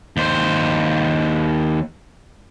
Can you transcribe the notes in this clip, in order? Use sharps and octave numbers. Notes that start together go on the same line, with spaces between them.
D#2 C5